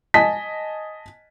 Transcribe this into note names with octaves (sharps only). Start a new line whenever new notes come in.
D#5 G#5 A5 B6